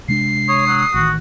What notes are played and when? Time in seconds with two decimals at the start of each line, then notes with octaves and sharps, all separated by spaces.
0.08 C3 G#3 D4 C7
0.48 C#5 D#6
0.67 F#3
0.94 A1 D#3 F#4